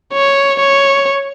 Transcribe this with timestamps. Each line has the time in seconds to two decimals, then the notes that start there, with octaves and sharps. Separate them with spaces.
0.13 C#5
0.60 C#5